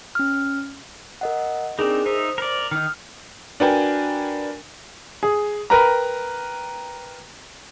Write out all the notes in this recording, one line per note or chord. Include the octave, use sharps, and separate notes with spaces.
C#4 F6
A#4 D#5 F#5
C4 D4 D#4 G#4 A#4
D#4 C5 E5
A#4 D5
D#3 D#4 F6
D4 F#4 A#4 B4 G5 G#5
G#4
A#4 B4 G5 A#5